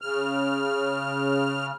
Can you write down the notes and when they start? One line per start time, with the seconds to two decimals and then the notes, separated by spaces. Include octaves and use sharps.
0.01 C#3 F6